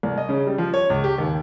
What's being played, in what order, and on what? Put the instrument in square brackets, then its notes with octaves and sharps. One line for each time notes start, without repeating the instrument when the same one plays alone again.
[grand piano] C2
D#5
C#3
G3
F3
C#5
C#2
G4
D#2